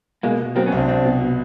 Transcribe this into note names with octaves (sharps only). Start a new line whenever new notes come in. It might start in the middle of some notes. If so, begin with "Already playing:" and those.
B2 G#3 A#3
B2
F#3 A#3 C4
B3 C#4
C2
C4 D4
C2 C4 D4
B2
B2